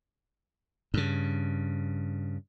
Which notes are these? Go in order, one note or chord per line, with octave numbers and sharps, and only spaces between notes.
G2 C#3